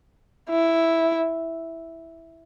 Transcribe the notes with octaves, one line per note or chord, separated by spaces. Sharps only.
E4